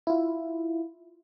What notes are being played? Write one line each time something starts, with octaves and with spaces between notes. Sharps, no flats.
E4 F4